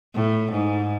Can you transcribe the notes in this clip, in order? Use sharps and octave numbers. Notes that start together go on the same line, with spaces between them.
A2
G#2